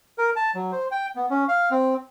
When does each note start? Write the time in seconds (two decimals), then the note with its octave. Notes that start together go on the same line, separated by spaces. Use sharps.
0.18 A#4
0.36 A5
0.55 F#3
0.72 C5
0.91 G5
1.16 B3
1.30 C#4
1.48 F5
1.71 C4